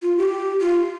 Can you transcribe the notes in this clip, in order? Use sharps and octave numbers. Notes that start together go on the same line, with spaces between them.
F4
G4
F4